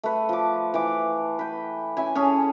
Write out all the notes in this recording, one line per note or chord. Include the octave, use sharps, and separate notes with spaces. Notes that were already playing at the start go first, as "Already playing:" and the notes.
A3 B4
F3 D6
E3 D6
B4 G5
C#4 E4 G#5
C#4 G#4 A4